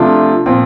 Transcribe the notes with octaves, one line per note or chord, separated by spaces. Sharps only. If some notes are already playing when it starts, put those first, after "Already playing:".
Already playing: C3 F3 A3 D4 F4
A#2 F3 C4 F4